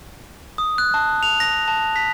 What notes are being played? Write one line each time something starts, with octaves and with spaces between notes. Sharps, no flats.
D#6
F#6
A5
F7
A#6
A5
B6